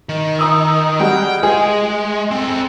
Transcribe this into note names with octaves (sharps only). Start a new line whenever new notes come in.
D#3
A#5 D#6 E6
G3 G#3 F#4 G5
G#3 G#4
C4 A4